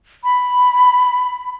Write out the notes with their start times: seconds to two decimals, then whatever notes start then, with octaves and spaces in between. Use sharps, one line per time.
0.24 B5